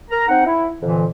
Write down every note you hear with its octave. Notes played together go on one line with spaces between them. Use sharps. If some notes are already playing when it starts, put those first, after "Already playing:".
A#4 A#5
C4 D#4 F#5
E4
F2 A#2 D3 E3